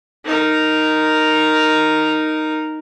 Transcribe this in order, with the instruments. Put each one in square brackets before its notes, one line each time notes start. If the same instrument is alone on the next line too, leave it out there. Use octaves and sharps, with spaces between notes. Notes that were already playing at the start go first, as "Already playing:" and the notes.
[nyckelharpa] D#4 A#4